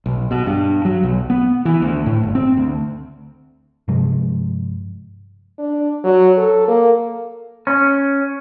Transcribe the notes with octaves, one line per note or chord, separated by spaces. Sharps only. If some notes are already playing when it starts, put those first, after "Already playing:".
B1
B2
G2
F#3
B1
B3
E3
D2
A2
G1
C4
D2
G2 C3 F3 G#3
D4
F#3
A4
A#3
C#4